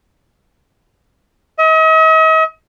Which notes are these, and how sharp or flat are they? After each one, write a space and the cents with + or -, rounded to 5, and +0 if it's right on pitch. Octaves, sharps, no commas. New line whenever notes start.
D#5 +45